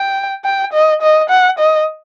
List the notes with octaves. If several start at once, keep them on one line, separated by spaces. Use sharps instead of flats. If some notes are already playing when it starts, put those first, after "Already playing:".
Already playing: G5
G5
D#5
D#5
F#5
D#5